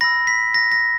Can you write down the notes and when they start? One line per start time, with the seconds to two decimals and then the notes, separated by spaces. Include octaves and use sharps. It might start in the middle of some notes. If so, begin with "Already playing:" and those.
0.01 B5 E6 A#6
0.27 B6
0.54 A#6
0.72 A#6